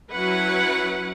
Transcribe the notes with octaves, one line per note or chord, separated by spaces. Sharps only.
F#3 C#4 E4 B4 F#5